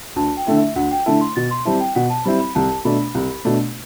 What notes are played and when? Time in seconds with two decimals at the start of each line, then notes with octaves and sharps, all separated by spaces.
0.16 D2 A5
0.37 G5
0.47 D3 A3 E4
0.56 E5
0.76 D2 F#5
0.91 G5
1.06 D3 A3 E4 A5
1.21 C6
1.36 B2 A6
1.51 C6
1.65 G3 C4 E4 A5
1.80 G5
1.95 B2 F#5
2.10 A5
2.25 G3 C4 E4 B5
2.40 B5
2.55 C2 A5
2.85 B2 A3 D4 B5
3.15 C2
3.45 B2 A3 D4